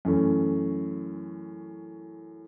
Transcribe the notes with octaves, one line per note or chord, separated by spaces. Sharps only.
F#2 E3 A3 C#4